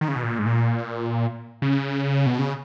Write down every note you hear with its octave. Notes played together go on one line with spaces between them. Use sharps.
D#3
C#3
B2
A#2
G#2
A#2
C#3
B2
C#3